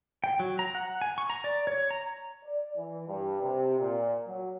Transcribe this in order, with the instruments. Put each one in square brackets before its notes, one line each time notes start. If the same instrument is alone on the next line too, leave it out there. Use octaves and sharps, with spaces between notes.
[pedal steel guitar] G5
F#3
A#5
F#5
G#5
C#6
A#5
D5
C#5
A#5
[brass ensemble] D5
E3
G2
C3
A#2
F#3